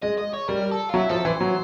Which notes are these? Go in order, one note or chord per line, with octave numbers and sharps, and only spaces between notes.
G#3 D#5
D#5
C#5
G3 A#4
A4
F4
F#3 E4
F3 A4
E3 C5
F#3